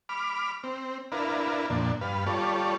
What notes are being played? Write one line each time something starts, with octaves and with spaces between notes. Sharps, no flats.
B5 D6 F6
C4
D4 E4 A#4 B4 F5
F2 A#2 D4
G2 B4 F5
G3 F4 A4 C#5 D5